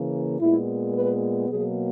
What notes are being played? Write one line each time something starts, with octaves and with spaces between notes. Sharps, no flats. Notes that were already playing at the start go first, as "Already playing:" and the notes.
Already playing: C#3 E3 A#3
A#2 G#3 B3 E4
B4
B2 F#3 A#3 G#4